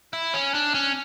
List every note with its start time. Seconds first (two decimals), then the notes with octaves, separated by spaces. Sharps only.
0.13 E4
0.34 C#4
0.54 D4
0.74 C#4